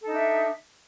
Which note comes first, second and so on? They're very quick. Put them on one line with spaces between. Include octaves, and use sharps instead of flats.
A4 D#4 D4 E5